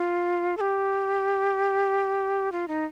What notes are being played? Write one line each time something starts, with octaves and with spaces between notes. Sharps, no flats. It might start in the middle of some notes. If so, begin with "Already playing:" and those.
Already playing: F4
A4
G4
F4
D#4